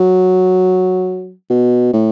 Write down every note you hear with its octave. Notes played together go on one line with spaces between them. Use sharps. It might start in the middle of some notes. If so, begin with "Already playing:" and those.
Already playing: F#3
B2
A2